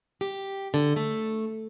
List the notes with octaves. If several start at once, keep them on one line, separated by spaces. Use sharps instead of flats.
G4
D3
A3